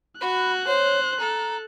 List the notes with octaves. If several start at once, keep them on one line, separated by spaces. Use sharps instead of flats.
F#4 B5 F#6
C5 C#5
A4 A#5